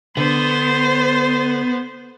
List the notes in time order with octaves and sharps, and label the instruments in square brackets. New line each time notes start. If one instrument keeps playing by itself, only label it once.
[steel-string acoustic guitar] D3 [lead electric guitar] B3 [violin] C5